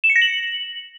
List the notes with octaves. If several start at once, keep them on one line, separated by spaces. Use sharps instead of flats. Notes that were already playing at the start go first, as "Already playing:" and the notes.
E7
C#7
A#6
F#7